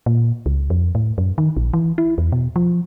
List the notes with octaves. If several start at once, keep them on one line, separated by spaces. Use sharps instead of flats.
A#2
C#2
F2
A2
F#2
D#3
A#1
E3
E4
E2
B2
F3